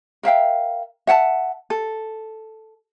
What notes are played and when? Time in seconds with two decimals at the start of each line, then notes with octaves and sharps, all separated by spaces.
0.23 A#4 E5 F5 G5
1.07 E5 F#5 G5 A5
1.70 A4